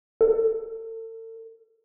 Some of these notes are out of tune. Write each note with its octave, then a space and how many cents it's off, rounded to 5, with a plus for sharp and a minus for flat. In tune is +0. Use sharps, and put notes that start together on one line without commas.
A4 +40